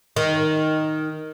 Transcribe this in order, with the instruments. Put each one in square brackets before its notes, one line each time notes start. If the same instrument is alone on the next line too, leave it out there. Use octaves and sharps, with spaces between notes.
[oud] D#3